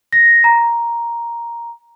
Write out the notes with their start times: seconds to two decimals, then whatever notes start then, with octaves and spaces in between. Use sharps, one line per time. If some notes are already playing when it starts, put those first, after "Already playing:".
0.13 A#6
0.44 A#5